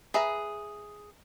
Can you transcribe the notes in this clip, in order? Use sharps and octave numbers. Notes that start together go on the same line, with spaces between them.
G#4 B4 E5 A#5